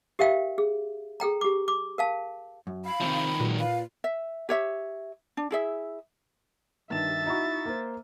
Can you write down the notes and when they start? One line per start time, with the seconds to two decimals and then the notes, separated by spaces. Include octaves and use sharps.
0.19 G4 A#4 E5 F5 G5
0.58 G#4
1.20 G#4 A4 G5 A#5
1.41 G4 D6
1.68 D6
1.98 A#4 F5 A5
2.67 F#2
2.85 F5 B5
3.01 C3 D#3 F3 C4
3.40 A#2 F#3 G#3 B4
3.60 B4 F5
4.04 E5
4.49 G4 C#5 E5
5.37 D4
5.51 E4 G#4 E5
6.91 G2 D#3 E5 A6 E7
7.26 D#4 E4 F#4
7.65 A#3 C5